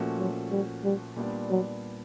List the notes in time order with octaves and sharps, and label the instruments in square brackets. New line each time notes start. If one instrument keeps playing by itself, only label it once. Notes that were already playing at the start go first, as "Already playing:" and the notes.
Already playing: [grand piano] A#2 F3 A3 C#4 F#4
[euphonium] F#3
G3
G3
[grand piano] A#2 G3 B3 D4
[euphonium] F#3